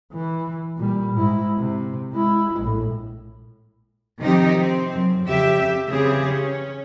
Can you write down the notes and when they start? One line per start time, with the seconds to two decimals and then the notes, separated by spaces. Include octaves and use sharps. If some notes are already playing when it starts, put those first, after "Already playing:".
0.13 E3
0.77 A#2 G3
1.15 G#2 E4
1.58 C3
2.13 G#3 E4
2.60 A#1 A2
4.20 C3 D#3 F3 C4 D#4 G4
4.60 C4
4.96 F#2
5.27 F2 C#3 G4 E5
5.90 C#3 E3 C4 G4 G#4
6.29 C#4